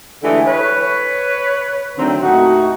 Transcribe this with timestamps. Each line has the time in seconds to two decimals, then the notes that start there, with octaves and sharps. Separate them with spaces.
0.23 D3 E3 G#3 A3 G4 A4
0.46 B4 C#5
1.97 D3 D#3 F#3 A3 C4
2.21 D#2 A2 A3 D#4 F#4